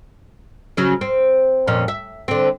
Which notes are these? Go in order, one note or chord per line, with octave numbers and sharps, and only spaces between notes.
C#3 F#3 C#4
C4
F2 A#2 C#4
E5
D3 C4